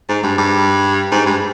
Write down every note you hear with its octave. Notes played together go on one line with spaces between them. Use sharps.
G#2
G2
G2
G#2
G2